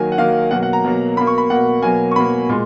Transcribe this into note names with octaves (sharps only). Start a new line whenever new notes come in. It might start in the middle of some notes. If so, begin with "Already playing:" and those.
Already playing: D#3 F#3 A#3 G#5
F#5
D#3 F#3 A#3 F5
B2 F#3 A#3 F#5
F#5
A#5
B2 F#3 A#3
B2 A#3 B5
C#6
B5
B2 A#3 F#5
B2 F#3 A#3 G#5
C#6
B2 F#3 A#3 B5
A#2 G#3